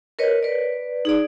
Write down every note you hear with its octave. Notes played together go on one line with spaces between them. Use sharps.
A#4 B4 C#5 D#5
B4 D5
D#4 G#4 D5